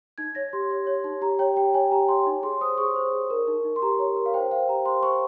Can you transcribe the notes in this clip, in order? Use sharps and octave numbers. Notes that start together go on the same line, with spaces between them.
D#4 G#6
C#5 A#6
G4 C6
C#5
C#5
D#4
G4 A#5
C#5 G5
G4 G5
C#5 G#5
G4 A#5
C#5 C6
D#4
G#4 C6
C5 D#6
G#4 C#6
C5
G#4
A#4
D#4
D#4
C6
G4 A#5
C#5
A#4
F5
C5 G5
C5 F5
G4 A#5
C5 C6
C5 C#6